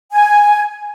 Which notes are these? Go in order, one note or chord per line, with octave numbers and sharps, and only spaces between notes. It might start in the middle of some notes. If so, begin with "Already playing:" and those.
G#5